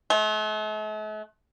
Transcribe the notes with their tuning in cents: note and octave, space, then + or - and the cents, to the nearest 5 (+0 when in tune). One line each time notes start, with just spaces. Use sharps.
A3 -45